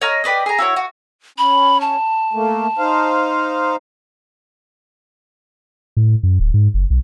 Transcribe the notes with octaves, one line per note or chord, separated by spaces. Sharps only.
C#5 D#5 A#5 F6
G4 B4 D5 D#5
G#4 A#5
E4 F#4 C#5
F#4
C#4 B5
A5
A3 A#3
D#4 C5 F5
A2
F#2
D1
G#2
F#1
B1